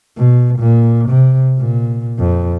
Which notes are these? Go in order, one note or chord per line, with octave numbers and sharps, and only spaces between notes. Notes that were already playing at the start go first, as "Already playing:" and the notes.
B2
A#2
C3
A#2
F2